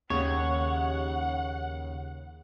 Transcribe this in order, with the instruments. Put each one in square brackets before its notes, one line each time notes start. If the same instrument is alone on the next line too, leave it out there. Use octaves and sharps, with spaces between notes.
[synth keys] D#2 [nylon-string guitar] C#3 [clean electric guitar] C#5 [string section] F#5